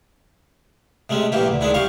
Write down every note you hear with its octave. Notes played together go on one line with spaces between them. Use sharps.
C3 G#3 A3 C#4
A#1 C3 E3 A#3 G4
D2
D#3 G#3 D4 E4
C2 F3 G4 F5 C#6